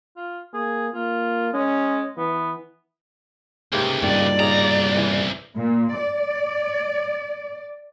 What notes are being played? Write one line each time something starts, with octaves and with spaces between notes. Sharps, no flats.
F4
A#3 G#4
A#3 F4
G#3 C#4
E3 B3
C#2 G#2 C3 A#3
G2 A#2 D#3 D4 D5
C2 C#3 D#4 A#5
E3
A#2
D5